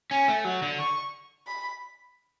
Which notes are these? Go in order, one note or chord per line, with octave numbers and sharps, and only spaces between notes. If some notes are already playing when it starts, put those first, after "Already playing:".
C#4 G#5
A3
F#3
D3
C#6
B5